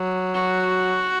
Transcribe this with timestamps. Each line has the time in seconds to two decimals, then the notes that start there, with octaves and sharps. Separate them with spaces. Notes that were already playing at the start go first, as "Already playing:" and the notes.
Already playing: F#3
0.35 F#4